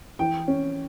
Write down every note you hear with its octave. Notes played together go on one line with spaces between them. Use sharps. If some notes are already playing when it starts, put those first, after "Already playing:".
E3 G5
C#4